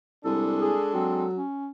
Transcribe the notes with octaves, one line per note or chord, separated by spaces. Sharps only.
C2 G#3 D4 A4
G#4
F#3 C4
C#4